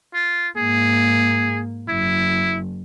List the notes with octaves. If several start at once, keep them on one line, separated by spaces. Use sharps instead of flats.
F4
G#2 A#3 G#4
F#1 E4